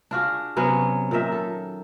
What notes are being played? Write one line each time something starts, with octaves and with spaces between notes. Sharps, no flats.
D4 F4 F#4 G#4
C3 F#3 B3 C#4
A#2 D#3 D#5 E5
A4